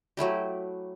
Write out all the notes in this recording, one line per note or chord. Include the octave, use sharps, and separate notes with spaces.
F#3 A3 E4 G4